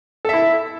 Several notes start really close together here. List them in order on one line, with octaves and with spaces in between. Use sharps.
A4 E5 E4